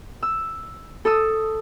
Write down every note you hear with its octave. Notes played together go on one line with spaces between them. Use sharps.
E6
A4 D#6 E6